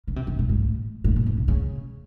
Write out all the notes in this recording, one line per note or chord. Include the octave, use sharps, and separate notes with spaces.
C#3
C3
C#3
B2
G#2
A2
A2
A#2
B2
C3
C#3